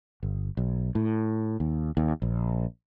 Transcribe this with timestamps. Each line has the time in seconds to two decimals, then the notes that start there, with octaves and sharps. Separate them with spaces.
0.23 G1
0.57 B1
0.95 A2
1.60 D#2
1.97 D#2
2.22 A#1